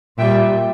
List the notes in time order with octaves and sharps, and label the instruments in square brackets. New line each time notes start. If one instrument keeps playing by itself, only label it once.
[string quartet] A#2 G3 E5 G5